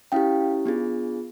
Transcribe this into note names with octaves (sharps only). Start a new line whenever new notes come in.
C#4 E4 G4 F5 G5
B3 D4 F4 G#4